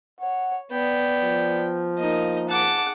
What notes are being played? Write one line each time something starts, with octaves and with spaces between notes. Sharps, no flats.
C#5 F#5
B3 D5 G5
F3
A#3 D#4 A#4 D#5
G#4 F#5 A5 D6